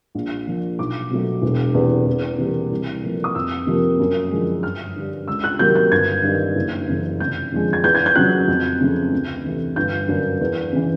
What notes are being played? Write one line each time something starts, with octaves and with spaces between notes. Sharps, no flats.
A#1
A#2 F3
B1 D6
B2 F#3 A3
E1
E2 C3
E2
C3 E3 G3 A#3
C2
A#2 F3 A3
D#6
F2 E6
C3 F3 A#3
F#2
D3 F3 G#3
G1 F6
G2 D3
C#2 E6
F#6
C3 D#3 F#3 A#3 G6
G6
G1 G#6
G2 D#3
F#1
F#2 C#3 E3
F1 G6
F2 D3 F3 G#3
G#6
E2 G6
G#6
G6
C#3 F#3 F#6
F2
C#3 F3 A3
D2
C3 E3 A3
G1 G6
F#2 D3
E2
C#3 E3